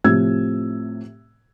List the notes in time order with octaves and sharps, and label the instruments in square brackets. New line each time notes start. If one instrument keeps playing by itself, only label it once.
[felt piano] A2 C3 F3 E6 G#6